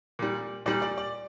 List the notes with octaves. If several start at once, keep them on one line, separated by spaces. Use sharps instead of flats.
A#2 G3
A#2 G3 D5
D5
D5